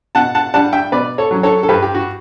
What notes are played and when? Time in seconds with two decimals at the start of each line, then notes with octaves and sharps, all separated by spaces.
0.15 B2 F#5 A5
0.35 F#5 A5
0.54 G3 D4 F#5 A5
0.73 E5 G5
0.92 B2 B4 D5
1.18 A4 C#5
1.31 F#3 C#4
1.43 A4 C#5
1.63 A4
1.69 G2 G4 B4
1.82 G4
1.95 F#4